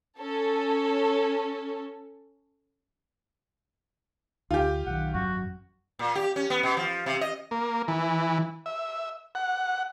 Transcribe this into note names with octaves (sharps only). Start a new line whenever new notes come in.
C#4 A4
D2 F4 G4
B1 D#3 F#5
G#1 F#2 F#3 F#4
A#2
G4
C#4
B3
B2
F3
C3
D#5
A#3
E3
E5
F#5